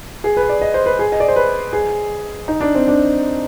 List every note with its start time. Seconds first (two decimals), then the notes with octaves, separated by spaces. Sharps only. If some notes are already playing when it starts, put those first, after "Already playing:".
0.24 G#4
0.37 B4
0.49 D5
0.61 D#5
0.74 C5
0.86 B4
0.99 G#4
1.12 D#5
1.20 D5
1.28 C5
1.36 B4
1.73 G#4
2.48 D#4
2.61 D4
2.75 C4
2.88 D4